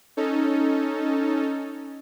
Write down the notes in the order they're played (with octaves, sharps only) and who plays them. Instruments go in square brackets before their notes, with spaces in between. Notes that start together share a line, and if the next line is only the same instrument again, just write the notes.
[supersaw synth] C#4 D#4 A4